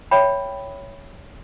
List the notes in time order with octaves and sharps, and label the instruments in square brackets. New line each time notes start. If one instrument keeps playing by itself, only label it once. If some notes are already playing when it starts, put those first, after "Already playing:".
[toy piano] C#5 E5 G5 B5